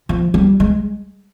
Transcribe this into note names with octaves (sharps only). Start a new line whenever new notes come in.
F3
G3
G#3